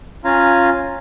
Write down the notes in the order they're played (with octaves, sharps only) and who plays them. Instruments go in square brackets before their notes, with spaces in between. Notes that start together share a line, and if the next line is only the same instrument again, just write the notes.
[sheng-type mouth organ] C#4 F4 F5 G#5 A#5